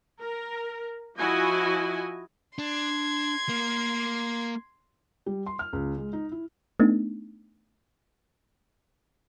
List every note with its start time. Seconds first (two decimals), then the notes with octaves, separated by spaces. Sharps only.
0.21 A#4
1.18 F3 E4 F#4 D#5 G#5
2.58 D4 C6 G#6
3.49 A#3
5.26 G3
5.46 C6
5.59 F6
5.73 C#2
5.98 G#3
6.13 D#4
6.32 E4
6.80 A3 B3 D4 D#4